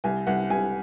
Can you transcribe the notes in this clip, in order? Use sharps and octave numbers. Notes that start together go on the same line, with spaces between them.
C2 G#5
C2 F#5
C2 G#5